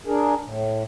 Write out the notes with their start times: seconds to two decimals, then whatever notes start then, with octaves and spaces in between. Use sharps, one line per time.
0.07 D4 G#4 A#4
0.44 A2